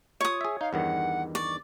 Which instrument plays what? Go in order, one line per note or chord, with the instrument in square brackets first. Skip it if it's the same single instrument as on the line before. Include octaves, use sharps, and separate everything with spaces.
[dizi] F4 [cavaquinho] C#5 D#6
[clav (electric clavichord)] G#4 E5
[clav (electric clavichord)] D#4 [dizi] F5
[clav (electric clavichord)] E2 G2 D#3 [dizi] F#5
[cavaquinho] D5 [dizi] C#6